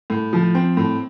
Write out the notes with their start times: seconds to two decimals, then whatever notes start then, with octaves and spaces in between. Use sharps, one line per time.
0.10 A2
0.33 F3
0.55 C4
0.77 A2